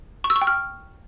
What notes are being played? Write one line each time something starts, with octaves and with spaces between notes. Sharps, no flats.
C#6
E6
C#6
G5
F6